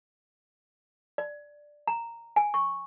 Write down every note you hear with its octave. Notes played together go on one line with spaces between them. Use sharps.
D5
A#5
G#5
C#6